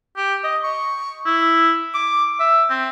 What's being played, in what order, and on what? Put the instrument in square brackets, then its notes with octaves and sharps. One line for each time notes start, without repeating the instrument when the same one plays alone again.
[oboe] G4
D#5
C#6
E4
D6
E5
C4